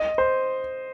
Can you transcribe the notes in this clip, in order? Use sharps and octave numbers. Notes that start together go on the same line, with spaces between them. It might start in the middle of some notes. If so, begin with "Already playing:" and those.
Already playing: D#5
C5